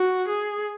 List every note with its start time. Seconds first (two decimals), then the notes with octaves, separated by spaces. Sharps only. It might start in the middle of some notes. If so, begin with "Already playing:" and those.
Already playing: F#4
0.29 G#4